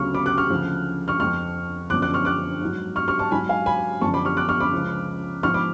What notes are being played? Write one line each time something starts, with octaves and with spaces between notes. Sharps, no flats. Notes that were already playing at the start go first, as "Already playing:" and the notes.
Already playing: D2 C#3 F#3 C#6 F6
B5 D6
D6 F#6
C#6 F6
D2 C#3 F3
C#6 F6
F2 F3 C#6 F6
F#2 D3 F3 D6 F#6
D6 F#6
C#6 F6
D6 F#6
G#2 F#3
C#6 F6
C#6 F6
A5 C#6
G#2 F#3 G#5 B5
F5 G#5
G#5 B5
F#2 D3 F3 A5 C#6
B5 D6
C#6 F6
D6 F#6
C#6 F6
B5 D6
C#2 C#3 F3
G#2 F3 C#6 F6
B5 D6